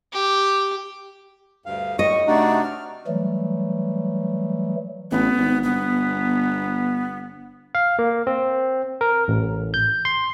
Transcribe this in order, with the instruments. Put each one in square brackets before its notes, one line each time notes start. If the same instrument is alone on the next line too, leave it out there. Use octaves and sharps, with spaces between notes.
[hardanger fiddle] G4
[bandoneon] D2 G2 F5
[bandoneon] A2 G3 [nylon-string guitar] D#5 [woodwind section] C#6
[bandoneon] C3 D#4 F#4 [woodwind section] A3 D4
[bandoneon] F6
[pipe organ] E3 F#3 G3 A3
[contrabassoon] A1 [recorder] B3
[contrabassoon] G#1
[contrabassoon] G1 [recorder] B3
[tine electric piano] F5
A#3
C4
A#4
A1
G6
C6